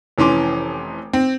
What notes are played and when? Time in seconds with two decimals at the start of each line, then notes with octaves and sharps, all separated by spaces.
0.18 F1 E3 C#4 C6 D6
1.13 C4